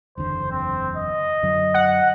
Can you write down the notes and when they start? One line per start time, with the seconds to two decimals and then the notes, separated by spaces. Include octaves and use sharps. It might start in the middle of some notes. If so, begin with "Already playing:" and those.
0.18 F#1 E2 D3 C5
0.51 C4
0.96 D#5
1.43 F#2 D3 F#3
1.74 F#5